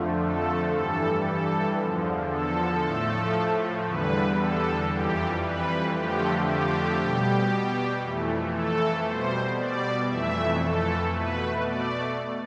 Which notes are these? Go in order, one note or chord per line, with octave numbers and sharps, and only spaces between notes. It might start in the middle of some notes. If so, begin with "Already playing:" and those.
Already playing: F2 D3 F3 A3
A4
G2 E3 G3 A4
A4
E2 D3 F3
A4
A2 F3 A3
E2 D3 G3 B4
A4
F2 E3 G3 G4
B4
F2 D3 F3 A3 G4
G4
B2 G3
F2 E3 A3
A4
B2 G3 C5
D5
F2 E3 A3 E5
A4
B2 A3 B4
D5